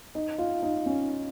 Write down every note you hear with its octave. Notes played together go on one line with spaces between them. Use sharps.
D#4
F4
D#4
C#4